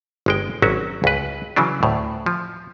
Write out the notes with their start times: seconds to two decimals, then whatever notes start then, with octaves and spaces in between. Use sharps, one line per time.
0.26 G1 G#3 G5
0.62 G#1 F#3 C#4 F#4 E5
1.04 C#2 B4
1.56 C#3 E3 F#3 D4
1.83 D2 A2
2.26 F3